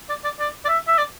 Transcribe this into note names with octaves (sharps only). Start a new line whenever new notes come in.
D5
D5
D5
D5
E5
E5
D5